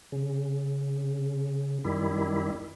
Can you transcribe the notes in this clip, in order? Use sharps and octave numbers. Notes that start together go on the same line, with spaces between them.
C#3
F#2 D#3 G3 E4